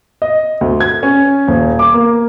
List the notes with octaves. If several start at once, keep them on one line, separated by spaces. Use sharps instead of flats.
D#5
D2
G#6
C#4
D#1
D6
A#3